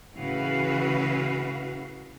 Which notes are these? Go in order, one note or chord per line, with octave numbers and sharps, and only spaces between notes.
A2 C#3 E3 F#4 B4 F5